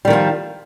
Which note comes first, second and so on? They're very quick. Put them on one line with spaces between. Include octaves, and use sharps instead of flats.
G3 D#3 F3 F4